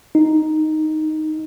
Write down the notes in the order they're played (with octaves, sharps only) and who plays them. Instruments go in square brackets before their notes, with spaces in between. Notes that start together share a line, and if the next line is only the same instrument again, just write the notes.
[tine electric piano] D#4